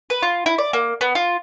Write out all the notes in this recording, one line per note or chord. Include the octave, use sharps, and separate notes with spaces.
B4
F4
E4
D5
A#3
B3
F4